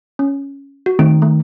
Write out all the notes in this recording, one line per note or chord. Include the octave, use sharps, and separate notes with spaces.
C#4
F#4
D#3 A3 C4 D7
A3